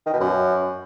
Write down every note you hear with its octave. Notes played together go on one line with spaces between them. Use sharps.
D#3
B2
F#2